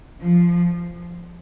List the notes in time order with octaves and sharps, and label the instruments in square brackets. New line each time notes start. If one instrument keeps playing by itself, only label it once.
[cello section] F3